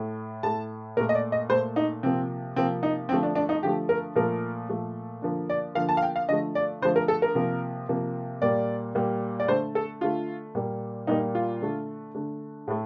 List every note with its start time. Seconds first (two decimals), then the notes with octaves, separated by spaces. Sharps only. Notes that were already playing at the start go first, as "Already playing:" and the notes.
Already playing: A2 A3
0.43 A2 A3 A5
0.97 A#2 A#4
1.00 A3
1.09 D#5
1.15 D5
1.32 D#5
1.49 A#2 A3 C5
1.76 D#4
2.03 C3 F3 A#3 C4
2.56 C3 F3 A#3 C4
2.83 D#4
3.09 D3 F3 A3 C4
3.23 D4
3.35 D4
3.49 D#4
3.63 D3 F3 A3 G4
3.89 A#4
4.15 A#2 F3 A3 A#4
4.69 A#2 F3 A3
5.22 D3 F3 A#3
5.50 D5
5.75 D3 F3 A#3 F5
5.89 A5
5.97 F5
6.03 G5
6.16 F5
6.28 D3 F3 A3 D#5
6.55 D5
6.82 D3 F3 A3 C5
6.96 A#4
7.08 A4
7.22 A#4
7.35 C3 F3 A#3
7.89 C3 F3 A#3
8.42 A#2 G3 A#3 D5
8.95 A#2 G3 A#3
9.40 D5
9.48 D3 A3 C5
9.75 A4
10.01 D3 A3 F4
10.55 A#2 G3 A#3
11.07 A#2 G3 A#3 D#4
11.35 F4
11.61 D3 A3
12.15 D3 A3
12.68 A2 A3